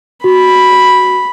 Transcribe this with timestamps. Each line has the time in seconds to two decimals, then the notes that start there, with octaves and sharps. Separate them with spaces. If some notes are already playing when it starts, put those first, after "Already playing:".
0.24 F#4 B5